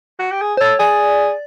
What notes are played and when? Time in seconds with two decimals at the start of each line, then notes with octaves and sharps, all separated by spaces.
0.20 F#4
0.31 G4
0.42 G#4
0.57 C5
0.61 A4 C#5
0.80 G#4 D5